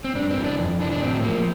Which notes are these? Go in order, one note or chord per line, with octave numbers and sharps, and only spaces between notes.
C4
G2 D4
C4
E3
D4
F2
E3 D4
D4
A2 C4
F3 A#3